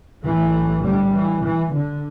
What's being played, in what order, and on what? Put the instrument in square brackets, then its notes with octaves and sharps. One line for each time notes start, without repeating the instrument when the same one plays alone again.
[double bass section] B1 A2 E3 A3
D3 G3
E3
E3
D3